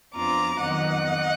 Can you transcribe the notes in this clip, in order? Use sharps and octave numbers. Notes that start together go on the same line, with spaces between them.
F2 F3 B3 D4 F4 A#5 D6
F2 D#3 F#3 B3 D#5 F#5